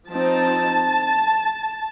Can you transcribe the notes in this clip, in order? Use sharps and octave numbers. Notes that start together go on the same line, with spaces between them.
F3 C4 D#4 A5